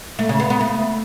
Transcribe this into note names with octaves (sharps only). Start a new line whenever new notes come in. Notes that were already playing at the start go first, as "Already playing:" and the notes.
A3
C#3
B3
B3
A3